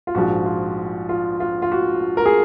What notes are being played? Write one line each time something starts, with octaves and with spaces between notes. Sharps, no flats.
F4
A#1 G#2 F3 F#4
F4
F4
F4
F4
F#4
A#4
G#4